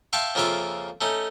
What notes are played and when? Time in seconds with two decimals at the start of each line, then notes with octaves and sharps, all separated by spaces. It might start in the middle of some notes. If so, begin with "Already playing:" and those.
0.13 E5 F5 G5 A5 C6 C#6
0.35 F2 C#3 A#3 F4 E5 D6
1.01 A3 C#4 D#4